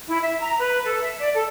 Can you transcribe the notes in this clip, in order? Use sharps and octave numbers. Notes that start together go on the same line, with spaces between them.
E4
E5
A#5
B4
A4
E5
D5
A4